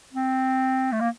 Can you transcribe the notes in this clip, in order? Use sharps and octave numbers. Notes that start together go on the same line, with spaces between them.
C4
A3
A#3